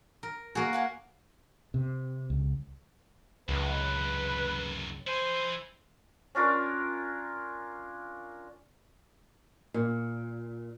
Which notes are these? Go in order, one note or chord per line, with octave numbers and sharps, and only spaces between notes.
A#4
A#3 F#4 G#4
F5 F#5 G#5
C3
C#2
C#2 F#2 C3 B4
E4 C5 G#5
C#4 D4 F4 A#4
A#2